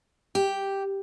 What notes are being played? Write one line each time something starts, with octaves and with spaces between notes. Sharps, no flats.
G4